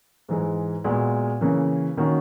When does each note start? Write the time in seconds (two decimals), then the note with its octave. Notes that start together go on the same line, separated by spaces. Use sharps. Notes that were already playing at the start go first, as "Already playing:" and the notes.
0.29 G#2 E3 G#3
0.84 A#2 G#3 B3 F#4
1.41 C#3 E3 A#3 C#4
1.97 D#3 A#3 C#4 F#4